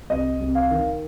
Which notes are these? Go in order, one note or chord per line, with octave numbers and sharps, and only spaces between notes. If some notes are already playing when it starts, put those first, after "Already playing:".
C2 D#5
C2
F5
D#3